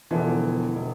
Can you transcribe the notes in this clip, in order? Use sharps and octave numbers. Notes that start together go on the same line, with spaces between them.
E1 D3 E3 F3
E1